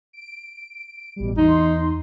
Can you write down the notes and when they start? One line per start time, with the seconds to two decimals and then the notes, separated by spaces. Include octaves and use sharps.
0.13 D7
1.16 A1 B2 G3
1.37 E2 D#4 C6